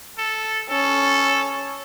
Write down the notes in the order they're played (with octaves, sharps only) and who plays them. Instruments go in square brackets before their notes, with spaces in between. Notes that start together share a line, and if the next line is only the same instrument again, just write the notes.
[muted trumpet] A4
[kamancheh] C#4 [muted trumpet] A4